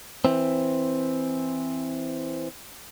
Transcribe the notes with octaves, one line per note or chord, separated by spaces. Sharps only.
E3 C4